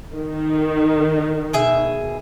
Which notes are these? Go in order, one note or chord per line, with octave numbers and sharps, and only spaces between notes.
D#3
B2 G#4 E5